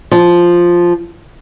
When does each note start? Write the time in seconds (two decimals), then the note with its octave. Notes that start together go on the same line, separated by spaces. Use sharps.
0.11 F3